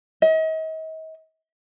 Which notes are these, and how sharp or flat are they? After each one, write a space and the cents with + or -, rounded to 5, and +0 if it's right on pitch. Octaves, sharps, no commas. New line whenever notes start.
D#5 +40